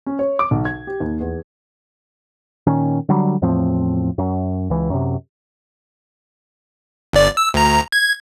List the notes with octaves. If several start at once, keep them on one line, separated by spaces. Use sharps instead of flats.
C#4
C#5
D6
B1
G#6
G4
D#2
E2
A#2 D#3 C#4
D3 F#3 G3
E2 A2 F3 C4
F#2
C#2 E3
F#2 C3
G1 D5
E6
D2 A#5
G#6